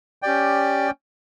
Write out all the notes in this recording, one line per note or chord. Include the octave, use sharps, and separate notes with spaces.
C#4 G4 D5 G5